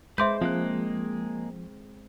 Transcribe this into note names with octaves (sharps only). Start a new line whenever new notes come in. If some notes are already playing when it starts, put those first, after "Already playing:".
G#3 B4 C5 E5 C6 D6 G6
F3 G#3 A#3 C4 F#6